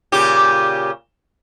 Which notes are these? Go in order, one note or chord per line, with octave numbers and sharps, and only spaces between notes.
A#2 C#3 G4